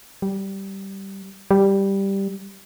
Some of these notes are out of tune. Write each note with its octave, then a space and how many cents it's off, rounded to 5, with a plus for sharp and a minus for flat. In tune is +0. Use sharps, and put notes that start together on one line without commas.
G3 -10
G3 +0